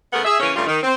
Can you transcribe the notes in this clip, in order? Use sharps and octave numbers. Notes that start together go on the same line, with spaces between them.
C#3 A3 B3 G#4 A#4 F#5
G#4 E5
C#3 E3 A#3 C#4
G2 C#3 G3 A3 F4
D#3
C4